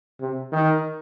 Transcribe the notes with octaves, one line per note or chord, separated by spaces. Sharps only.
C3
D#3